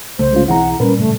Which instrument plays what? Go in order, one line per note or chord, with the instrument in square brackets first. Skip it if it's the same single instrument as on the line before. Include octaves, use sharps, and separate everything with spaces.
[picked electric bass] C2 C#3 A3 [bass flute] C5
[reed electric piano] G#3 C#4 F4
[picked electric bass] B1 E3 C4 [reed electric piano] E4 G#4 A#5 [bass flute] F#5
[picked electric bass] A#2 G3 [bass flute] C#4 [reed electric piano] A#4 B4
[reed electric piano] F#2 A2 C#3 [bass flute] A3